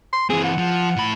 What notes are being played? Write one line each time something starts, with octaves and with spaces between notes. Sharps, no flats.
C6
E3 C4 G#4
F#5
F3
A2 B5